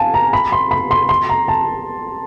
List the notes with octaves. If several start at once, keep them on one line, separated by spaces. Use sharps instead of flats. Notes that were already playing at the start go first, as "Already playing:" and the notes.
Already playing: F5 G#5 A5
A#5
B5
C6
B5
C6
C6
A#5
A5